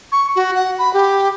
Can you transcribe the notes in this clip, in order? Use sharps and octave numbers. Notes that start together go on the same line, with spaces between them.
C#6
F#4
F#5
B5
G4